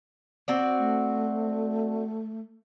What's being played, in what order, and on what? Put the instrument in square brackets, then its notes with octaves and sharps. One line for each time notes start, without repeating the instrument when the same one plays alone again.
[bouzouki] C4 F#4 D5
[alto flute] A3